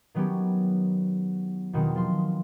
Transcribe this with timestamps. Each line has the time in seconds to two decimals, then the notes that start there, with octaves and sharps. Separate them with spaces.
0.15 D#3 F#3 B3 C#4 G4
1.73 E2 B2 D#3 F#3 C4
1.96 F3 C6